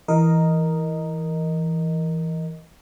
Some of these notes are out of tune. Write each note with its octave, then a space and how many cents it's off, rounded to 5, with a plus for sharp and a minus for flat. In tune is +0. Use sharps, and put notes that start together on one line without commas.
E3 -5 A#4 +0 D#5 +0